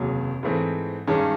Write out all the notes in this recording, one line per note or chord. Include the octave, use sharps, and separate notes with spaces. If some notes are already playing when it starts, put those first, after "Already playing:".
Already playing: F1 D#2 C#3 F#3
G#2 E3 A3 C4
G2 D#3 G#3 C#4